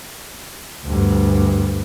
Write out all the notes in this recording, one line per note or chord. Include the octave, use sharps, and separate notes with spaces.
D2 G2